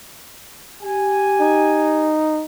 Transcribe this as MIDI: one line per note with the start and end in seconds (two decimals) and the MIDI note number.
0.82 2.14 67
0.82 2.14 80
1.41 2.45 63